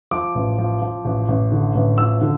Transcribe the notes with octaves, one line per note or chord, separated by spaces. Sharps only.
F3 D6
A1
F3
F3
A1
A1
D3
A1
F3 E6
D3